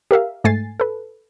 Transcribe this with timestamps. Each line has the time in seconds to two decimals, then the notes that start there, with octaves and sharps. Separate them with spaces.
0.11 G4 A#4 E5 F5
0.44 G#2 A3 G#5 A6 C7
0.80 A4 B4